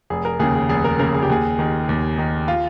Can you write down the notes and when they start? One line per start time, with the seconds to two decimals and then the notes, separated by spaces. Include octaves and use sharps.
0.10 F1 G#4
0.25 A#4
0.39 D#2 C#3 G#4
0.55 G#4
0.69 F1 G#4
0.84 A#4
0.99 D#2 C#3 A#4
1.14 G#4
1.23 G4
1.29 D#2 G#4
1.59 D#3
1.89 D#2
2.18 D#3
2.48 F4